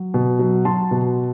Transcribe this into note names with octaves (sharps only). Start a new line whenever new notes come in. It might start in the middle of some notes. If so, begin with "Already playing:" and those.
Already playing: F#3
B2
F#3
F#3 A5 C6
B2